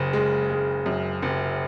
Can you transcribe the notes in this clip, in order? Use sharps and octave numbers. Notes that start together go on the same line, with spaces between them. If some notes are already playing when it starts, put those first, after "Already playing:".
Already playing: F#1 C#3
G#3
G#3
F#2
F#1